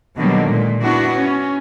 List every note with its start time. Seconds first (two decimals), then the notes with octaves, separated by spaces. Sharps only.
0.16 B2 D3 D#3 F#3 G3 A#3
0.46 A#2 G#3
0.81 B3 D4 E4 F#4
1.16 C#4